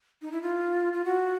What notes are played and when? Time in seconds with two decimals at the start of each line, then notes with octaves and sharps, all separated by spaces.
0.22 D#4
0.32 E4
0.42 F4
0.93 F4
1.05 F#4